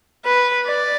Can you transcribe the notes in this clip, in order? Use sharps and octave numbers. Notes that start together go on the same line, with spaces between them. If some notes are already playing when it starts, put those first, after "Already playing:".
B4
D5